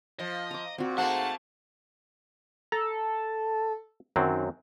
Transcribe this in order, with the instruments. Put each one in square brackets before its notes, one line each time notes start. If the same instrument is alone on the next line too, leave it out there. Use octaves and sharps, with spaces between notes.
[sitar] F3 [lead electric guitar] D#5
[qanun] A#5 D6
[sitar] A#2 [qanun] C4 F#4
[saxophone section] G#2 C5 F#5 [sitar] A3 A#3 [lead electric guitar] A5
[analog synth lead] A4 [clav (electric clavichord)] A#5
[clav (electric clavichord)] F#2 F#3 C4 [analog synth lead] D#3